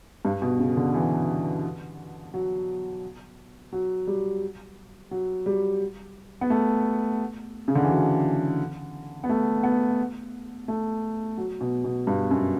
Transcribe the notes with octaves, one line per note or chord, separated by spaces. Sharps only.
G2
B2
C#3
D3
E3
F#3
F#3
G3
F#3
G3
B3
A3
C#3
D3
E3
F#3
B3
A3
B3
A3
F#3
B2
B2
G2
F#2